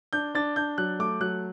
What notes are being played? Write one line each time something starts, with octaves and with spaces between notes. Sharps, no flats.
D4 G6
D4 A6
D4 G6
F#3 F#6
A3 D6
F#3 F#6